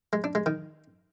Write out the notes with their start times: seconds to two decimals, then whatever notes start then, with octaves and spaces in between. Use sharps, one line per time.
0.13 G#3
0.24 D4
0.35 G#3
0.46 D#3